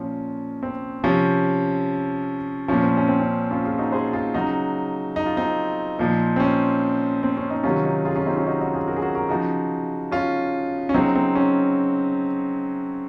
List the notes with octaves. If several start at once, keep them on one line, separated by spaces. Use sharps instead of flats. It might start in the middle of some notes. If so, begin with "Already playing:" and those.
Already playing: A#2 F3 C#4
C4
C3 F3 C#4
A#2 F3 C#4
C4
C#4
C4
C#4
C#4 F4
F4 G#4
D#4 F#4
G#4 C5
F4 G#4
C#3 F#3 D#4 F#4
D#4
F4
C4 D#4
A#2 F3
C4
C#4
C4
C#4
C4 D#4
C3 D#3 F#3 C#4 F4
D#4 F#4
F4 G#4
C#4 F4
C4 D#4
C#4 F4
D#4 F#4
D#4 F#4
F4 G#4
F#4 A#4
G#4
F#4 A#4
F#4 A#4
C#3 F3 D#4 F#4
C#4 F4
C#4
C#3 F#3 C4 D#4
C4
C#4